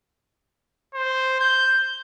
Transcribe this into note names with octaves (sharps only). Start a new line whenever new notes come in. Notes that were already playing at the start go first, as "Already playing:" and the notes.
C5
G6